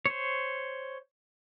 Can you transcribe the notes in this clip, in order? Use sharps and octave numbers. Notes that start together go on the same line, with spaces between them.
C5 C#5